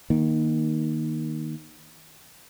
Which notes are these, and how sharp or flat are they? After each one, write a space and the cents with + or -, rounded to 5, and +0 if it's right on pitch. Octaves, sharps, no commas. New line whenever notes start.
D#3 +0 A#3 +10